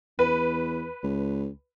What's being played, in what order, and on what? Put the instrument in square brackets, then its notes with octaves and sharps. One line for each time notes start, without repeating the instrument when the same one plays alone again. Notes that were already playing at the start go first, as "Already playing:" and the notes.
[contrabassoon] E2 [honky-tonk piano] B4
[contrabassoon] C#2